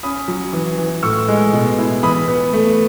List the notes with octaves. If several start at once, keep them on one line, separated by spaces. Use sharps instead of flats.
C#4 B5 D#6
F#3
E3
E3
A2 C#6 E6
G#3
B2
E4
E3 B5 D#6
B3
A3